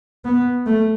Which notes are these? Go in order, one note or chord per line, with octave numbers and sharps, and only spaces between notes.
B3
A3